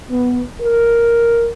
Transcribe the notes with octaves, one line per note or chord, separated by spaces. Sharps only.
B3
A#4